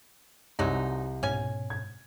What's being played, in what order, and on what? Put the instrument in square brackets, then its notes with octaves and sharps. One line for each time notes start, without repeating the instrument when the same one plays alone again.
[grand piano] C2 [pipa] F#3 G#3 D#4
[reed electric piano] G#2 B2 [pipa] C#4 G#5
[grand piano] G#6